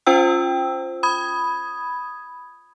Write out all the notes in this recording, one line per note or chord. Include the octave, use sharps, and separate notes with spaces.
C#4 F4 C5 G5 E6
B5 D#6 G#6